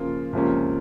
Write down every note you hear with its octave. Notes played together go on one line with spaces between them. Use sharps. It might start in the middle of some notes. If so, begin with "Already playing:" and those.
Already playing: C#3 F3 A#3 F4
C#2 C3 F3 A#3 C#4